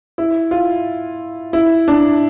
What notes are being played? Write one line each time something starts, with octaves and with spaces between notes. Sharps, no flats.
E4
F4
E4
D4